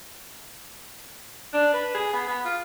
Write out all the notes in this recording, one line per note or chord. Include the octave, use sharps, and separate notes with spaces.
D4
B4
G#4
B3
B3
F4